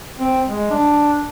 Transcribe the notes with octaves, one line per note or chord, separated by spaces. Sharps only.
C4
G#3
D4